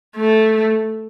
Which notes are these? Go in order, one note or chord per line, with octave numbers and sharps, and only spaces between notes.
A3